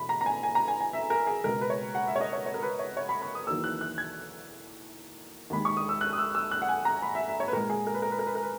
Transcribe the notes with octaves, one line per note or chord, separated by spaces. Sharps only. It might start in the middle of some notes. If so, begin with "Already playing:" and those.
Already playing: E2 B2 B5
A#5
A#5
G#5
G#5
A#5
G#5
G#5
E5
A#4
G#4
C#2 B2 G#3 A#4
B4
C#5
F#5
E5
C#5
D#5
C#5
C#5
A#4
B4
C#5
C#5
B5
B5
D#6
E2 D#3 F#3 A#3 E6
F#6
F#6
G#6
D#2 D#3 G#3 B5
C#6
D#6
E6
F#6
D#6
E6
E6
F#6
F#5
G#5
A#5
B5
E5
E5
C#5
B4
A#2 G#3 A#4
G#4
A#4
B4
A#4
B4
A#4
B4
A#4
B4